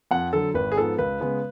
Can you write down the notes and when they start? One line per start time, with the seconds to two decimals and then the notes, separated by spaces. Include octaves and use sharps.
0.11 F2 F#5
0.33 D3 F#3 A4
0.54 G#1 B4
0.72 G#4
0.76 G#2 F3 B3 A4
0.98 C#2 B4
1.20 C#3 G#3 B3